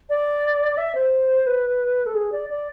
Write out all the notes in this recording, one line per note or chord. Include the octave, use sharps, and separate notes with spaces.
D5
E5
C5
B4
A4
G#4
D5
D5